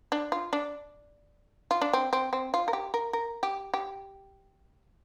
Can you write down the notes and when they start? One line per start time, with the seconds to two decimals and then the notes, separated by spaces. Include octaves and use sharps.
0.12 D4
0.32 F4
0.53 D4
1.71 F4
1.82 D4
1.93 C4
2.13 C4
2.33 C4
2.54 F4
2.68 A#4
2.73 G4
2.94 A#4
3.13 A#4
3.43 G4
3.74 G4